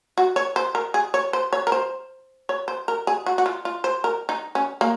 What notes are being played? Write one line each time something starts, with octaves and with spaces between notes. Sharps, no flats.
F#4
C#5
C5
A#4
G#4
C#5
C5
C#5
A#4
C5
C#5
C5
A#4
G#4
F#4
F#4
F4
F4
C5
A#4
D#4
C#4
A#3